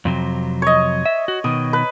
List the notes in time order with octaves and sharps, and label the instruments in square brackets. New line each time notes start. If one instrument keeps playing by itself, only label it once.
[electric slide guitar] F2 C3 F#3
[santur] C#5 D#5
[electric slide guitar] E5
F#4
[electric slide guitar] B2 D#3 [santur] D#6
[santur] B4